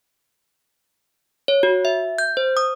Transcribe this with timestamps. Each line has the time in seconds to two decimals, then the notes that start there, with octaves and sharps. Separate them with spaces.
1.48 C#5
1.63 F#4
1.85 E5
2.18 G6
2.37 C5
2.57 D#6